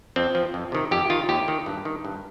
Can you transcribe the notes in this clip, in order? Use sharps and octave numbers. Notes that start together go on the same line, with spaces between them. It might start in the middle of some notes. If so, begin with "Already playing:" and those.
F2 C4
F3
F2
C3 D#3
F2 G4
D#3 F4
D#2 G4
D#3
G2
D#3
G2